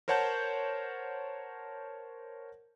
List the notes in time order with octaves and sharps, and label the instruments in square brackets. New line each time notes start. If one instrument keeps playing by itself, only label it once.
[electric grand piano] A#4 C5 C#5 F#5 A5 G6